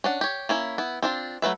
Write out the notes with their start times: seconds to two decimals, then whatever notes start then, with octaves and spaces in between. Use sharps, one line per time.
0.04 C#4 D4 F#5
0.21 G4 C#5
0.49 A#3 C#4 E4
0.78 B3 E4
1.02 C4 D4 F4
1.42 F#3 A3 B4 E5